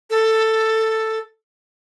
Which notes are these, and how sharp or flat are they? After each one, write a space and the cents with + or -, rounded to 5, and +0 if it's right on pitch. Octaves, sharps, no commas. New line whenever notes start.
A4 +10